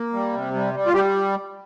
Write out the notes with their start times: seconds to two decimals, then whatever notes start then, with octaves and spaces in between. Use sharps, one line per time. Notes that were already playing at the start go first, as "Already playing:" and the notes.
Already playing: A#3
0.13 G3
0.33 C3
0.54 G3
0.74 G3
0.86 F4
0.93 G3 G4